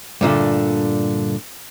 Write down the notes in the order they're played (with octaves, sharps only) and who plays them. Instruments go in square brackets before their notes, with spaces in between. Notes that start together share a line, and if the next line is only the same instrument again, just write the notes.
[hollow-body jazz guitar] G2 A#2 D3 A3